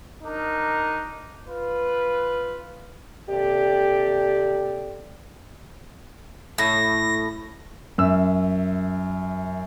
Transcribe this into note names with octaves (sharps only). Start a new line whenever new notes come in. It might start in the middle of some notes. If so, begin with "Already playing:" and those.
D4 D#4 A#4
F4 B4
D#2 C3 G4 A4 D5
A2 A#6
F#2 E5 E6